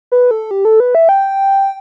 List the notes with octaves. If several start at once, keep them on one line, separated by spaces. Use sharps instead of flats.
B4
A4
G4
A4
B4
E5
G5